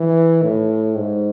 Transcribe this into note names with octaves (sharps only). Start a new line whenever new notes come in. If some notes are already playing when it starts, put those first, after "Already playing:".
Already playing: E3
A2
G#2